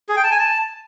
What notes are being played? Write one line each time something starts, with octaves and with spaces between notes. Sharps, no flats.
G#4
G5
A5
G#5
A5